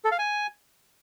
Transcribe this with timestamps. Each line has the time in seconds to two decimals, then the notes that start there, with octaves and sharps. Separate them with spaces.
0.05 A4
0.12 F5
0.19 G#5